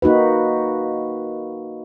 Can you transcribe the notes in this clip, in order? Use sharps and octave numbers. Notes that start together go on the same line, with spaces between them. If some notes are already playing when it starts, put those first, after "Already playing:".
A#3 D#4 F#4 B4